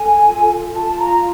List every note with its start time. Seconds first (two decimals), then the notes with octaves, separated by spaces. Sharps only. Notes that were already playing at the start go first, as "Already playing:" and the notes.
Already playing: A4 G#5
0.28 F4
0.74 F4 A5
0.98 A#5